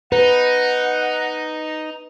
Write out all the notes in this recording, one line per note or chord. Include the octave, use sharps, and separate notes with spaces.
D#4 B4 F#5